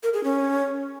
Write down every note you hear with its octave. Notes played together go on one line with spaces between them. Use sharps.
A#4
G#4
C#4